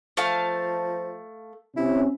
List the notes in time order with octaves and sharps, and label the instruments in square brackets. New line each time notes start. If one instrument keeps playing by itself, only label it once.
[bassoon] F3 [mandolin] A3 F5 A5
[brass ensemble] C3 C#4 [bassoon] E4